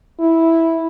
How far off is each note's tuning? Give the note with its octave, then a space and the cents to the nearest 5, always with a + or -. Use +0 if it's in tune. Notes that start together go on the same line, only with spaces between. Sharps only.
E4 -5